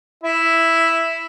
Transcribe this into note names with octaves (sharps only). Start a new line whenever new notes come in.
E4 E5